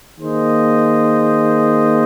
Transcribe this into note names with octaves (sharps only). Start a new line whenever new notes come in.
D#3 A#3 G#4 C5 D#5